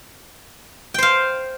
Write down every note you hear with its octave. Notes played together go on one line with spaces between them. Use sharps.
C5 F5 G5